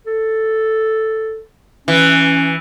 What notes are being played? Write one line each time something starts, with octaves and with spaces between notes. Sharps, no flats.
A4
E3 C#4